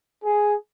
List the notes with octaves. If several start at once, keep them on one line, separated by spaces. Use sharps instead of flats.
G#4